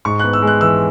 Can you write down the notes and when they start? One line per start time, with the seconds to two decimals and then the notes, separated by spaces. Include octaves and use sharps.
0.05 G#2 C#6
0.20 B3 F#6
0.33 E6
0.42 G#3
0.47 F#6
0.61 E3 E6